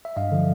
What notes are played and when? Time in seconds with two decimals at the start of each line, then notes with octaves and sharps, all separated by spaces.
0.05 E5
0.16 G2 D#5 F5
0.32 D3 F3